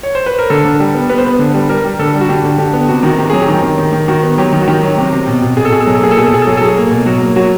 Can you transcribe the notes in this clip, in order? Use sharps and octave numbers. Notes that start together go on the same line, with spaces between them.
C#5
C5
B4
A#4
D3 A4
D3
G3
B3
B3 B4
C5
B3 B4
D3
G3
G3 A#4
G3
D3 A4
G3
F#4
D3 G4
D3
D3 G4
B3
C3 F#4
D#3 F#4
C3 G4
F#3 G#4
G4
D#3
D#3
D#3
D#3
D#3 F#4
B3
F#3 G4
D#3
F#4
D#3 G4
F#3
C3 G4
C3
B2
B2
B2 G#4
A4
B2 G#4
A4
F#3 G#4
A4
A#3 G#4
A4
B2 G#4
A4
B2 G#4
A4
F#3 G#4
A4
F#3 G#4
A#3
B2
F#3 F#4
A#3
F#3 F#4